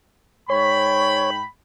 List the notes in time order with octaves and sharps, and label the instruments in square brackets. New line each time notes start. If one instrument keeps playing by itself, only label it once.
[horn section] G#2 G5 B5 [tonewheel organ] C#5